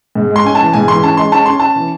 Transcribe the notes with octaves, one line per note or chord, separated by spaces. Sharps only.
G#2
G#3
C6
C#4 G#5
E3 A5
G#2 G#5
E3 C6
C#4 A5
G#3 C6
C#4 A5
C#4 C6
C#4 A5
E3